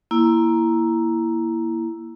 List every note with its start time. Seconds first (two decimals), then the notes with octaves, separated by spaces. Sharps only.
0.11 A#3 E4